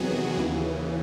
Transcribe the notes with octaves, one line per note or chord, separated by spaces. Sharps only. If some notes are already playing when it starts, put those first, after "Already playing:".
Already playing: E2 C3 D#3 F#3 B3 F#4 G#4
D#2 C#3 E3